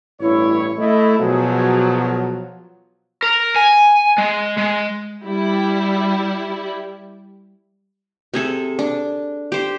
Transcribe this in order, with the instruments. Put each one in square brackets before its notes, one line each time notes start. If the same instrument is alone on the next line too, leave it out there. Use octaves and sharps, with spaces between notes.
[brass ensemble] A1 G2 C#5 [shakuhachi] E4
[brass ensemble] A3 E4 [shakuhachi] D#5
[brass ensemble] B2 F3 F#3 [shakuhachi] G#4
[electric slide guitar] A#4
G#5
G#3
G#3
[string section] G3 E4
[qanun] C3 G#4 A4
D4
G4 C5